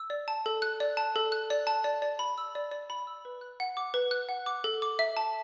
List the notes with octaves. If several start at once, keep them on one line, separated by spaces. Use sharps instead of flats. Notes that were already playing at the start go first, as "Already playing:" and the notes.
Already playing: E6
D5
A5
A4
F#6
D5
A5
A4
F#6
D5
A5
D5
D5
B5
E6
D5
D5
B5
E6
B4
F#6
F#5
D6
B4
F#6
F#5
D6
A4
D6
E5
A5